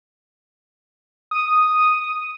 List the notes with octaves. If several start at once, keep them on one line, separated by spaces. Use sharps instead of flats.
D#6